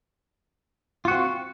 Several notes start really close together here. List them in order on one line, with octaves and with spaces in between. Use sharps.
F4 F#4 C4